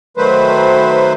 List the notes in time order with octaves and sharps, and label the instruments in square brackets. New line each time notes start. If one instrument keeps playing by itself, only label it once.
[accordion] D#3 F#3 A3 B4 C5